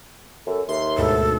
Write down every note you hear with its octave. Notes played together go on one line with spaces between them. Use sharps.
F#2 A4
D#2 E5 C6
D2 G#2 B2 A4